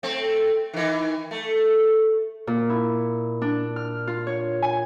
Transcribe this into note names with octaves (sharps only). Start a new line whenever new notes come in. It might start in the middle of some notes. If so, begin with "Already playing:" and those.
A3 C4
D#3 E3
A3
A#2
E4
D4
F6
F4
C#5
G#5